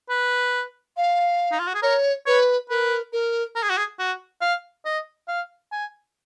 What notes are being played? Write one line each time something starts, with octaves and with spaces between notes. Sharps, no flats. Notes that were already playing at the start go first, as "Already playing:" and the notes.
B4
F5
D#4
F4
F#4
G#4
A#4 C#5
B4 C#5
A#4 B4
A#4
A#4
G#4
F#4
G#4
F#4
F5
D#5
F5
G#5